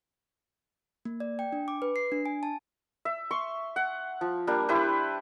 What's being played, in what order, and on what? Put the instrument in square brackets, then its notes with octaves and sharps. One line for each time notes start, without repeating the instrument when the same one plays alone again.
[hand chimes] A#3
D5
G5
D4
D6
B4
C7
D4
G#5
A5
[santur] E5
C6 C#6
F#5
F3
G3 A#3 D4
E4 G4 B4 C5